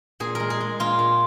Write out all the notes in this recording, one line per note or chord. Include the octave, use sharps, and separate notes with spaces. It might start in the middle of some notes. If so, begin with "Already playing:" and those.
A#2 G#4
G#3 A#4
G#4
G#3
A#2 F4
A#2